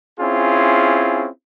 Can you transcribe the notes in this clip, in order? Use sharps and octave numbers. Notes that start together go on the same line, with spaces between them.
C4 C#4 E4 F4 G#4